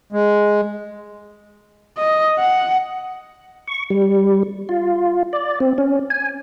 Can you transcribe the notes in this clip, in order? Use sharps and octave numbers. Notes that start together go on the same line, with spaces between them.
G#3
D#5
F#5
C#6
G3
F4
D5
C4
C#4
G#5